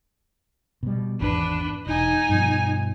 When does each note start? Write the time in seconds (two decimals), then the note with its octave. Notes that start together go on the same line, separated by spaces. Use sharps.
0.83 B2 G3
1.20 G#1 E2 D4 B4
1.86 E1 D#4 G#5
2.29 G2 B2 F3